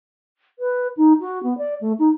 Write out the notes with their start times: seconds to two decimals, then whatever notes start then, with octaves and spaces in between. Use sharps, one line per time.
0.59 B4
0.97 D#4
1.20 F#4
1.43 B3
1.58 D5
1.81 A3
1.99 D#4